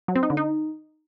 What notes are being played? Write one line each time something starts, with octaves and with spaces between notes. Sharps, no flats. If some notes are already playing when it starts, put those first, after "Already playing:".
F#3
C4
D#4
D3
D#4